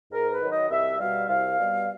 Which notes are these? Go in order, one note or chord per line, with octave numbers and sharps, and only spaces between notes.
G#2 A#4
B4
D#3 F#3
D#5
C2 E5
B2 G3 F5
C2 F5
B2 G3